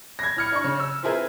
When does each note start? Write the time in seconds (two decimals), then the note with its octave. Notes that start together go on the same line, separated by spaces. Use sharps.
0.19 G#6 A#6
0.36 A2 F6 C#7
0.52 D4 C#6
0.64 C#3
0.80 E6
1.03 C4 E4 F4 G#4 A#4 B4